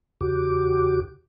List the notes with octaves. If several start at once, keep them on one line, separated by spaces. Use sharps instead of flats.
E2 C#3 F#4 G4 D6